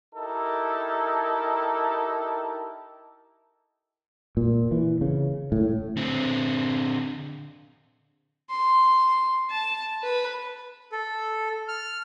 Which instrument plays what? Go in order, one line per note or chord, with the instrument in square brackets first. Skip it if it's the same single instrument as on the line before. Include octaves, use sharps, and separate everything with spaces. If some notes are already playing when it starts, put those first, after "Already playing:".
[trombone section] D#4 E4 G4 A4 A#4
[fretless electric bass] A#2
E3
C#3
A2
[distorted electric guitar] D3 C4
[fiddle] C6
A5
B4
[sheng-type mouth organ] A4
F6